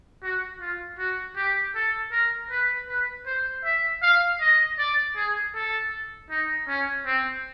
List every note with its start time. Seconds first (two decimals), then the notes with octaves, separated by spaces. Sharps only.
0.23 F#4
0.61 F4
0.99 F#4
1.36 G4
1.75 A4
2.12 A#4
2.50 B4
2.88 B4
3.26 C5
3.64 E5
4.02 F5
4.41 D#5
4.78 D5
5.16 G#4
5.55 A4
6.30 D#4
6.68 C#4
7.06 C4